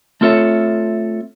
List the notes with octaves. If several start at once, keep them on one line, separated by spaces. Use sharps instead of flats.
A3 C4 F4 A4 C#5 E5